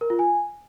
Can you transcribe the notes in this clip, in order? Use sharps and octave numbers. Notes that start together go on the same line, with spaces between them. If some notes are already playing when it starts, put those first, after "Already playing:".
A#4
F4
G#5